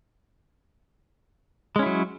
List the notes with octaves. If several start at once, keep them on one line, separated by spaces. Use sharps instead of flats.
F#3 G#3 C#4 E4